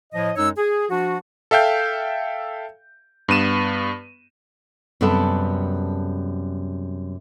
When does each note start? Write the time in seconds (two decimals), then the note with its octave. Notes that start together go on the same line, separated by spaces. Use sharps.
0.13 A2 F3 D#5
0.36 F#2 G#3 D#4 C#5 E6
0.57 G#4
0.89 F3 D4 F#4
1.51 A4 E5 F5 G5 G6
3.28 G2 B3 D#7 E7
5.01 F#2 C3 G3 B3 A4 A5